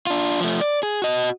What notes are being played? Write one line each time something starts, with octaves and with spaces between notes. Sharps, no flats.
D4 F4
F3 A3
D5
G#4
F#4 D#5